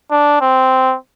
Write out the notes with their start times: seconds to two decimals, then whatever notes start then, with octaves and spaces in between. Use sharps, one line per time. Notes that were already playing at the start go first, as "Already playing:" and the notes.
0.11 D4
0.41 C4